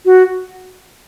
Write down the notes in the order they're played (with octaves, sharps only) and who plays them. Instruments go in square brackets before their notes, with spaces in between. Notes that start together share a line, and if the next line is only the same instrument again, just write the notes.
[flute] F#4